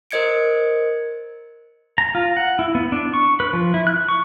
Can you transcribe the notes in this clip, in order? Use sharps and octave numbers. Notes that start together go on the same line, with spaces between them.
A#4 C5 D#5 G#6 C#7 D7
A#5
F4
F#5
E4
B3
D4
C#6
B4
F3
E4
F#6
C#6